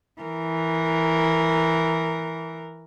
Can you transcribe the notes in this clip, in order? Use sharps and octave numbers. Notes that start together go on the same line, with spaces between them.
E3 A#4